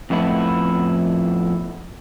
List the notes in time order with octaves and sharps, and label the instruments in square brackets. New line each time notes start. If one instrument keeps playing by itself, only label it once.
[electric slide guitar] F2 A2 B3 E4